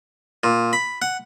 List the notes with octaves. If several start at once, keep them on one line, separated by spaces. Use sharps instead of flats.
A#2
B5
F#5